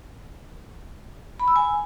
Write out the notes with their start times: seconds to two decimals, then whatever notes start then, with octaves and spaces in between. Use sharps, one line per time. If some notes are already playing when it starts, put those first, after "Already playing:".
1.40 B5
1.48 E6
1.56 G#5